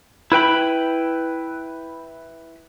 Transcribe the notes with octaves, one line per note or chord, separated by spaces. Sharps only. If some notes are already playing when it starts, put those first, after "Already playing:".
E4 B4 G5 B5